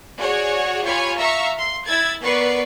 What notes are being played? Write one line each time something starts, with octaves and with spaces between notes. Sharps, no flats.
F#4 G#4 C#5 D5
F4 G4 C#5 G#5 B5 C#6
E5 F5 A#5 C#6 E6
C6
E4 E6 G#6 A6
B3 A#4 B4 D5 C#6 C7